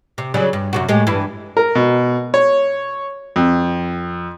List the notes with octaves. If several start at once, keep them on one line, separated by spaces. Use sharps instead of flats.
C3
C#3 F#3 G3
G2
F#2 C3 F#4
A2 G#3 G4
G2 E3 E4
A#4
B2
C#5
F2